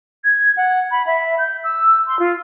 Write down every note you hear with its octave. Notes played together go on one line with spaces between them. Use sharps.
G#6
F#5
B5
E5
G6
E6
C6
F4